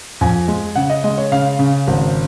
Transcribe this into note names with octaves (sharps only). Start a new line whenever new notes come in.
F2 G#5
G#3
C#3 F#5
D#5
G#3 D#5
C#5
C#3 F5
C#3
G#1